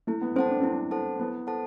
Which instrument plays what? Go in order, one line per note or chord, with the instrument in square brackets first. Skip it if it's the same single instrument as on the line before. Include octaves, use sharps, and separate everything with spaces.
[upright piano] A3 [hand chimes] E4
[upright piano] B3
[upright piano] C4 [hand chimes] A4 C5 F#5 A5
[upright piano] D4
[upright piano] C4 [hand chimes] E4
[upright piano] D4
[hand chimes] A4 C5 F#5 A5
[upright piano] B3 [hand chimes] E4
[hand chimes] A4 C5 F#5 A5